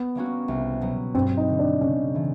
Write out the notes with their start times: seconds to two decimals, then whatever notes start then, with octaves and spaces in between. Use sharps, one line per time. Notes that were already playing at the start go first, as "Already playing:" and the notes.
Already playing: B3
0.15 G3 A#3 C#4 F#4
0.48 C2
0.81 B2 F#3 B3
1.15 G2 C4
1.37 D#4
1.48 D3 G3
1.59 D4
1.81 C#3 C#4
2.15 E3 A3